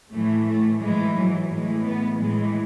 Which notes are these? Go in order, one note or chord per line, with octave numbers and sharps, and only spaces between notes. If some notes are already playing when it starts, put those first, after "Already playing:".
A2 E3 A3
A3
G#2 E3 G#3
F#3
A2 E3 G#3
B3
A2 E3 G#3